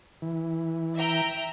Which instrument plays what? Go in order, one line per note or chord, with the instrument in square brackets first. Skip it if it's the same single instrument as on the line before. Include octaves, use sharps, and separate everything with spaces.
[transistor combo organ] E3
[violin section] E5 G5 A#5